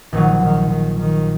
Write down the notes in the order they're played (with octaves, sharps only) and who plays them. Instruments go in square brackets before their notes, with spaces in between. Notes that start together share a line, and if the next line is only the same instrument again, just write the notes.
[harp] A#1 A#2 F#3 [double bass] D#3
[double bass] D#3
D#3
D#3